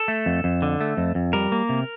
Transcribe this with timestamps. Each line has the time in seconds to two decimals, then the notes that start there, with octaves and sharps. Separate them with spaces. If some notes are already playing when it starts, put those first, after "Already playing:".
Already playing: A4
0.08 A3
0.26 F2
0.44 F2
0.62 D3
0.81 A3
0.97 F2
1.15 F2
1.33 G3 A#4
1.52 A#3
1.69 C3